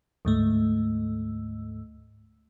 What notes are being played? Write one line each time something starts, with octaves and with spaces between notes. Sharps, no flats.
D2 G#2 A3